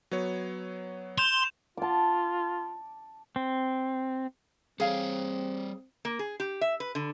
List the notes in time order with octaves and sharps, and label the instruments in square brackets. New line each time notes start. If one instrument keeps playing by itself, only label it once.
[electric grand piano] F#3 B3 C#5
[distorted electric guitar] C6 [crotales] G6 E7 F7
[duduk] F4 [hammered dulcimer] A5 D6
[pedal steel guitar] C4
[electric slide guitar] G3 C#5 [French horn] C4 [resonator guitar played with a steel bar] G#4 F5
[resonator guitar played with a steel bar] A#3
G#4
G4
E5
B4
D3